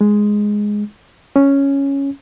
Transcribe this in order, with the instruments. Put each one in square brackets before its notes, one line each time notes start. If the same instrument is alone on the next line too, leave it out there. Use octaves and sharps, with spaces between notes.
[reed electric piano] G#3
C#4